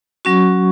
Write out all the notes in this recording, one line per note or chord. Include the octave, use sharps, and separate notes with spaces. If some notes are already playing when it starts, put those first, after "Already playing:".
F#3 C#4 F#4 C#6